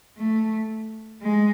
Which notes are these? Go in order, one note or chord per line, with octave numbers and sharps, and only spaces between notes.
A3
G#3